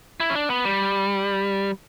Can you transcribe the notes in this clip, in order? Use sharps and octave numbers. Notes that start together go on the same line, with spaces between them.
E4
C#4
D4
B3
G3